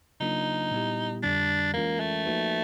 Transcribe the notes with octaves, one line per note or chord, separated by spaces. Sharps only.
C#3 F#3 A#3 D4 D#4 F4
A#2 G3 B3 E4 G4
F2 D3 G3 D4
E3 G#3 A#3 C#4 F4 A#4
A3
F3 A#3 D#4 F#4 B4